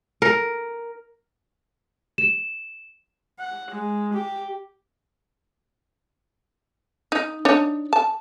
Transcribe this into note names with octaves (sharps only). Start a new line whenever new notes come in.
A#4
E7
F#5
G#3
G4
D#4
D4 D#4 C#5
A5